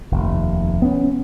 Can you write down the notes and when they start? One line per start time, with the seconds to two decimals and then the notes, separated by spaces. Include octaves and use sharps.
0.11 F1 D#2
0.82 B3 C#4